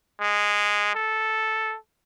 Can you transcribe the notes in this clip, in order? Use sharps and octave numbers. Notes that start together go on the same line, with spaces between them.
G#3
A4